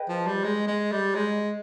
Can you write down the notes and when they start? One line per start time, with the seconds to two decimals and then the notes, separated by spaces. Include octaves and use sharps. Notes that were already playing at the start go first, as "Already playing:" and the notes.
Already playing: G#4 B4 D#5 G5
0.09 F3
0.27 G3
0.44 G#3
0.67 G#3
0.92 G3
1.15 G#3